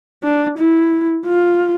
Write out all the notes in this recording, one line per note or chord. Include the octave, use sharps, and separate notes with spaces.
D4
E4
F4